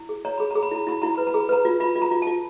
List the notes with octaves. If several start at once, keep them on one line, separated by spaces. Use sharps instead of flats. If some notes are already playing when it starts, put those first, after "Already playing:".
Already playing: E4
G#4
C#5 A#5
G#4 B5
G#4 A#5
B5
E4 A#5
E4 B5
E4 A#5
B4 B5
A#5
G#4
B5
B4 A#5
F4
F4 B5
F4
A#5
F4
F4 A5